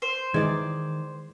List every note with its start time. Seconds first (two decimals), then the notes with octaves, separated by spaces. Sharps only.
0.02 C5
0.34 D#3 E3 G#3 D5 G#6